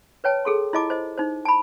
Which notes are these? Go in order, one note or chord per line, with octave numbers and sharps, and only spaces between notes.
B4 C#5 G5 A5
G#4 A4 C6
E4 F4 D#5 A5 D6
C5 D#5
D#4 C5
A5 B5